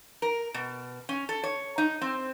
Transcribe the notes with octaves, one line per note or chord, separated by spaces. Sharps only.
A#4
B2
C#4
A4
C#5
D#4
C4